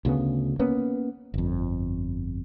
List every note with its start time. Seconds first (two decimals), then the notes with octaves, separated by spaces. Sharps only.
0.05 D2 C#3 B3
0.59 A#3 B3 C#4
1.34 G1 F2